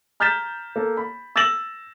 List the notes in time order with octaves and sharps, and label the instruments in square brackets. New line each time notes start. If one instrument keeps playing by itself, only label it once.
[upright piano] A#5 F6 G6 A6 B6 E7
A#3 A4
B5
E6 A6 A#6 E7 F#7